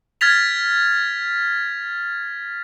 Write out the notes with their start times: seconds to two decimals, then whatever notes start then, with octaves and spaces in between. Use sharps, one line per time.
0.21 F6 G#6 A6 B6 F7